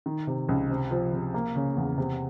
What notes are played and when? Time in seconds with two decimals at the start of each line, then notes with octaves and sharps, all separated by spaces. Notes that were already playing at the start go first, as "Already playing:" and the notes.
0.06 D#3
0.27 C3
0.49 C#2
0.70 C3
0.91 F3
1.13 C3
1.34 A#3
1.56 C#3
1.76 E2
1.97 C3